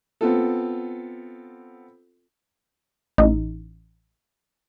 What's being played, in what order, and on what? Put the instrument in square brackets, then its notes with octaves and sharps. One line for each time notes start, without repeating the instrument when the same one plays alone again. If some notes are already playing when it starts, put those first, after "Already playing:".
[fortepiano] B3 C4 F4 A4
[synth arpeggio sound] A1 D#4